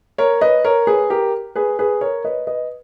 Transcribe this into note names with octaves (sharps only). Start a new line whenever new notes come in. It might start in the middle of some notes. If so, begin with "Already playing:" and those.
A#4 C#5
B4 D#5
A#4 C#5
G#4 B4
G4 A#4
G#4 B4
G#4 B4
A#4 C#5
B4 D#5
B4 D#5